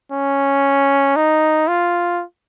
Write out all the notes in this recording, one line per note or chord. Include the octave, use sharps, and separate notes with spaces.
C#4
D#4
F4